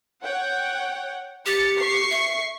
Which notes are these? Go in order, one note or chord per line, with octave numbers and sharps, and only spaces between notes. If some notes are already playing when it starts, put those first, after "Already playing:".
C#5 F#5 G5
G4 A6 C#7
C#6 C7
E5